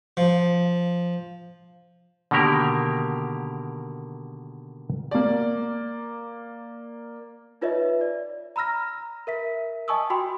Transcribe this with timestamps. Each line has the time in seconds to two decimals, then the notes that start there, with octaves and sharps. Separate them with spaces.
0.17 F3
2.31 B2 D3 D#3 A#3 G4 A#4
5.11 A#3 D5
7.61 D#4 F4 B4 C#5 D#5 E5
8.01 D5
8.56 A#5 B5 E6 F6 A#6
9.27 A#4 E5 B6
9.88 D#5 G#5 A5 C#6 D#6 E6
10.10 F#4 G5 G#5 B5 C6